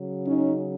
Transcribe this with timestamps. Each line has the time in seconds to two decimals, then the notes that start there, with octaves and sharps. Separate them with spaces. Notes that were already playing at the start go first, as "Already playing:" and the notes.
Already playing: C#3 F#3
0.26 C#4 D#4